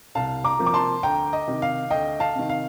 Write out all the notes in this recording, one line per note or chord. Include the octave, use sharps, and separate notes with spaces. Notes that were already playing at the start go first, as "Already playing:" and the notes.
C2 F5 A5
A#5 D6
C3 F3 A#3
D6
A5 C6
D2 G5 A#5
D#5
C3 D#3
F5
D2 D#5 G5
F5 A5
C3 D#3
F5